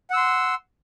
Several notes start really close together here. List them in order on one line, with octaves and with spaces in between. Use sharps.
F#5 E6 C6